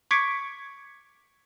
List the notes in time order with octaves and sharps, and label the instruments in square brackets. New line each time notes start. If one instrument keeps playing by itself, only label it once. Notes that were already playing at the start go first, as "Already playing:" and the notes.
[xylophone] C#6 D6 G#6 B6 C#7 D7